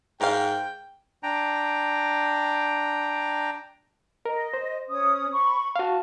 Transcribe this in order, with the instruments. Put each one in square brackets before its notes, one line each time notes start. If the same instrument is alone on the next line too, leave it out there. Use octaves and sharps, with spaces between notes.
[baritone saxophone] G#2 [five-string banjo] A#4 F5 [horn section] G5
[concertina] D4 G5 A#5
[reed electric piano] A#4 [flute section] D#5
[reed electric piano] C5
[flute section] C#4 D#6
B5 C#6
[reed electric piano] F#4 F5 [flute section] A5